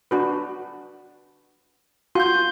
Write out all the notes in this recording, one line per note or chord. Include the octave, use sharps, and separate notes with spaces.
D4 F#4 B4
F4 F#4 C6 G6